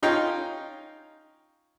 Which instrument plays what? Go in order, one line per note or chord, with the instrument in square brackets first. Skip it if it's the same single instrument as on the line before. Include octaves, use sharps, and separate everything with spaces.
[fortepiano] C#4 D#4 F4 G5